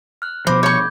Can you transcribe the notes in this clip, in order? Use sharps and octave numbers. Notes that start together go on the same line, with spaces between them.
F6 F#6
B2 F3 C5 B5 D6 A#6
C#5 C#6 G6 G#6